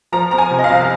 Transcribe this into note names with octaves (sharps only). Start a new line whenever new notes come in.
F3 A#5
C4 A#5
G#5
C3
D#5
F5
C2